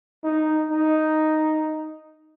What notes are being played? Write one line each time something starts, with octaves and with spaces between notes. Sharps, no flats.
D#4
D#4